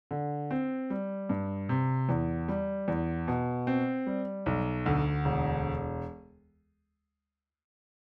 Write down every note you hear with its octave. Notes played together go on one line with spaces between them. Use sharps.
D3
C4
G3
G2
C3
E2
G3
E2
B2
C4
G3
B1
D2
E1